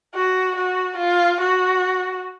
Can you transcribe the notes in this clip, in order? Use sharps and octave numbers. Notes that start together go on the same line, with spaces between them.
F#4
F#4
F4
F#4